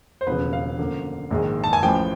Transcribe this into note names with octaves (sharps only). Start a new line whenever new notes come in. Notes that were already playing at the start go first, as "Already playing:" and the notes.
C5
E1 D#2 C#3 F3 B4
F5
F#2 D3 F3 A#3
A#1 G#2 D#3 G#3
A5
G#5
A1 A2 F3 G5